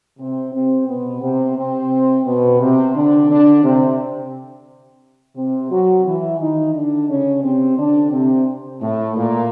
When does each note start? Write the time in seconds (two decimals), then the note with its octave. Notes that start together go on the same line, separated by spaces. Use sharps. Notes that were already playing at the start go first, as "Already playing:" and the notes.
0.19 C3 C4
0.53 C3 C4
0.87 B2 B3
1.22 C3 C4
1.57 C3 C4
2.26 B2 B3
2.60 C3 C4
2.95 D3 D4
3.29 D3 D4
3.64 C3 C4
5.36 C3 C4
5.71 F#3 F#4
6.05 E3 E4
6.40 D#3 D#4
6.74 D3 D4
7.09 C#3 C#4
7.43 C3 C4
7.78 D3 D4
8.12 C3 C4
8.81 A2 A3
9.16 A#2 A#3